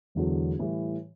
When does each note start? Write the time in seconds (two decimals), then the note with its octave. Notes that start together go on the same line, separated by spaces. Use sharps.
0.15 E1 E2 D3 F#3
0.59 A2 E3 G3